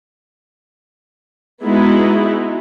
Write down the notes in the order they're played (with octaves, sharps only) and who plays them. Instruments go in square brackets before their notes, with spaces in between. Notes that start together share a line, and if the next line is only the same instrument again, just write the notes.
[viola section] G#3 B3 D#4 E4 F#4